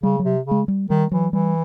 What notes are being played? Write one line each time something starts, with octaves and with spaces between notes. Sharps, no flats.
C#3 G3
F#3
C3
C#3
G#3
G3
D#3 G3
E3 F#3
E3 G3